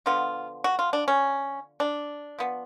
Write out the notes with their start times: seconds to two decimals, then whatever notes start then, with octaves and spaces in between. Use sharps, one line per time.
0.06 D3 F3 B3 F4
0.64 F#4
0.79 F4
0.93 D4
1.08 C#4
1.80 D4
2.39 F3 B3